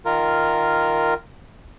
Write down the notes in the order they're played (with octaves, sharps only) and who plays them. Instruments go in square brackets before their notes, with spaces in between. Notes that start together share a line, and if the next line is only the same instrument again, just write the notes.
[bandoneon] D#3 F4 A#4